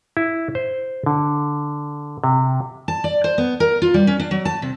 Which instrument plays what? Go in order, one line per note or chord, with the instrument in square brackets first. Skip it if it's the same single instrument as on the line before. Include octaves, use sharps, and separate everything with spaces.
[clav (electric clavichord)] E4
C5
D3
C3
[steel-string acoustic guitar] A5
D5
C5
B3
A#4
F4
G3
C#4
D4
F#3
A5
C3